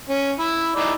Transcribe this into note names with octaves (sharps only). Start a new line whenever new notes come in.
C#4
E4
D#4 E4 D5